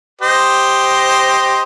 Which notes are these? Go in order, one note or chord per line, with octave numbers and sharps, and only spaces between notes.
G4 C5 D#5